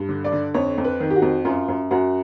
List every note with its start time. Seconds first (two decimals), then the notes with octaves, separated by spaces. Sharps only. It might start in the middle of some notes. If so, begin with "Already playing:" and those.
Already playing: G2
0.09 D3
0.24 D5
0.32 D3
0.54 F2 C#5
0.78 F2
0.84 B4
1.00 D#3
1.10 G4
1.16 F#4
1.22 F2
1.45 F#2 F4
1.68 F#2
1.91 F#2 F#4